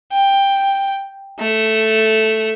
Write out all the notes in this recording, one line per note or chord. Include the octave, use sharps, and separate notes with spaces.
G5
A3